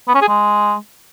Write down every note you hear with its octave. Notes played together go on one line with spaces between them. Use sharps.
B3
C#4
G#4
G#3